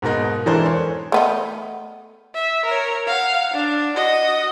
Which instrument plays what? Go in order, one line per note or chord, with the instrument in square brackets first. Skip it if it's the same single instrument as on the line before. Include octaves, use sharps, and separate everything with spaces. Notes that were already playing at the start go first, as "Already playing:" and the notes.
[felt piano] G#2 B2 A#3 D#4 F#6
E3 G#3 D4 A4 A#4 C5
C#5
[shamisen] A3 B3 D#4
[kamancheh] E5
A#4 C#5
F5 F#5
D4
F#4 D#5